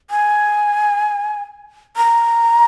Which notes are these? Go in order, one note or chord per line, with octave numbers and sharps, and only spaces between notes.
G#5
A#5